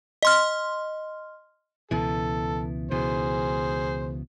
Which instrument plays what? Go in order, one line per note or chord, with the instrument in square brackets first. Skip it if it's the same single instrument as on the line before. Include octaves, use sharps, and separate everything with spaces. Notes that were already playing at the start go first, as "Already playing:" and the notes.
[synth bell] D#5 C6 F6
[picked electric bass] C#2 B2 E3 [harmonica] A4
[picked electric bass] C#2 B2 E3 [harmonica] G#4 C5